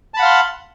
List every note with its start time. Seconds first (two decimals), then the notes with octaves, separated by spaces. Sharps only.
0.14 A5
0.17 B5
0.20 F#5
0.22 F5
0.25 C6